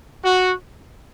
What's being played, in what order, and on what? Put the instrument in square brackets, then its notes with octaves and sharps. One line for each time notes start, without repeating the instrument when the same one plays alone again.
[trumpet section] F#4